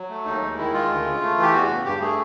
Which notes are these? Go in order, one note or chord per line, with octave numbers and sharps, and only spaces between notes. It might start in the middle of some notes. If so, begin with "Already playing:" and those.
Already playing: F#3
A3
D#2 D#4
G#3
D#3 E4
G#3 F4
D2
C#3
A3
E3
G4
E2 F#4
C#3
G2 G4
A3 G#4